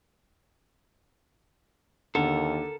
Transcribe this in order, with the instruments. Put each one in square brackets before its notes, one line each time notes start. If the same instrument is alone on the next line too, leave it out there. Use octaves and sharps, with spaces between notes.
[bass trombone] D#2 [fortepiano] D3 [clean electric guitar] A4 A#4